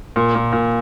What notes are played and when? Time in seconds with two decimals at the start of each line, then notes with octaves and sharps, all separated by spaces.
0.16 A#2
0.35 A#2
0.53 A#2